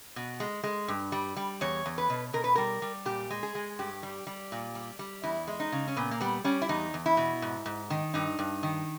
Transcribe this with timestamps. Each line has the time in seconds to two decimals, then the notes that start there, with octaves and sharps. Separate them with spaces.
0.16 B2
0.40 G#3
0.64 G#3
0.88 G2
1.12 G3
1.36 G3
1.61 E2 C#5
1.86 E2
1.98 B4
2.10 B2
2.33 B2 A#4
2.44 B4
2.55 G3 A#4
2.82 G3
3.05 A#2 G4
3.30 G#3
3.43 G#4
3.55 G#3
3.79 G2 G4
4.03 G3
4.27 G3
4.52 A#2
4.75 G3
4.99 G3
5.23 E2 E4
5.47 G#3
5.60 D#4
5.72 C#3
5.88 C#4
5.96 A#2 B3
6.11 A#3
6.20 G3 B3
6.44 G3 C#4
6.62 E4
6.69 E2 D#4
6.94 E2
7.06 E4
7.17 B2
7.42 G#2
7.66 G#2
7.90 D#3
8.14 G2 D#4
8.39 G2
8.63 D#3